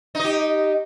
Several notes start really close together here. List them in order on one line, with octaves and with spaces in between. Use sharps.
D#4 D#5 G4